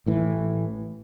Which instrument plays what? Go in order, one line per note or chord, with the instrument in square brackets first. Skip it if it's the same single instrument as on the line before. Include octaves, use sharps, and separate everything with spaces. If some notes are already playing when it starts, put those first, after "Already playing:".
[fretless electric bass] A1 A2 E3